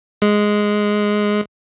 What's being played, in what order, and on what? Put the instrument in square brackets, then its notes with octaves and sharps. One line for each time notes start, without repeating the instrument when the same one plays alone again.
[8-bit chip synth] G#3